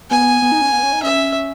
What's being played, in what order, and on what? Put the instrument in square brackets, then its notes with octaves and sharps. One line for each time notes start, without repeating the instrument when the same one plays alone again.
[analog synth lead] B3 [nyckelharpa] G#5
[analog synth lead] B3
D#4
C#4
B3
C#4
D#4
[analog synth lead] C#4 [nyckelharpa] E5